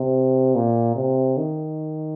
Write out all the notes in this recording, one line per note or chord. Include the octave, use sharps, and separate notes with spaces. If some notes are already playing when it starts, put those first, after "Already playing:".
Already playing: C3
A#2
C3
D#3